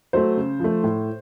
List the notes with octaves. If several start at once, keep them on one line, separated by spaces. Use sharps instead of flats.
F#3 A3 C5
C#3
F3 A3
A2